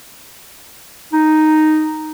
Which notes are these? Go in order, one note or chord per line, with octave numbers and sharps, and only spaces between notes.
D#4